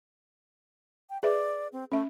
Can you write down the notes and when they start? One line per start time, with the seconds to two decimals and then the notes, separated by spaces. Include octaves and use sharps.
1.10 G5
1.23 G#4 B4 D5 E5
1.72 C4
1.92 A3 C#4 E5